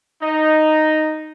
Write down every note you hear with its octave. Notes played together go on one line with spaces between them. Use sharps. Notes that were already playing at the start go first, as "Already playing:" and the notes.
D#4